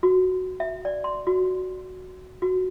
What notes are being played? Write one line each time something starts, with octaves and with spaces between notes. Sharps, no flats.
F#4
E5
D5
C6
F#4
F#4